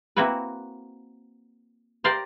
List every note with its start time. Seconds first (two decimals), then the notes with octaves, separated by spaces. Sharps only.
0.16 A#3 C4 E4 F#4 B4
2.04 G4 A#4 C5 D5 F5 G5